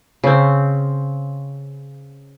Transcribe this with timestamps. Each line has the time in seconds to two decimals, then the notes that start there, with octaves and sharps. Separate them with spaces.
0.24 C#3 C4